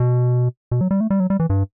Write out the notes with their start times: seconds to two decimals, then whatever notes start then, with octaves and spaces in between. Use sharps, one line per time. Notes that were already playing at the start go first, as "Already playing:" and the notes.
Already playing: B2
0.71 B2
0.81 F#3
0.91 G3
1.00 A3
1.10 G3
1.20 F#3
1.30 G3
1.40 E3
1.50 G2